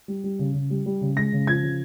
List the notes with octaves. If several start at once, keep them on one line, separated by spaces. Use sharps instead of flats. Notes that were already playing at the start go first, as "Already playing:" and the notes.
G3
G3
C#3
C#3
G3
G3
C#3
G#3 A#6
C#3
F3 G#6
C#3